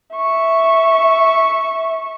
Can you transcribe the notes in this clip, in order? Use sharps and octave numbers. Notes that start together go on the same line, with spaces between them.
E5 C#6